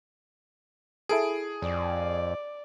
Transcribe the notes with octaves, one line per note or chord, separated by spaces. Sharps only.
E4 G#4 A4 D7
F2 D5